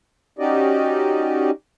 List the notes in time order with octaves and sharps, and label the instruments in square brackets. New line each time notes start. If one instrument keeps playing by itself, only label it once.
[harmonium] C#4 D#4 F#4 G4 D5 D#5